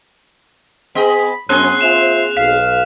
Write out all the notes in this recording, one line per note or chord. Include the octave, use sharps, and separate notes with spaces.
B3 G#4 D#5 B5
F#2 A#3 C4 G#4 C6 F#6
F4 C5 E5 E7 F7
B1 F5 B6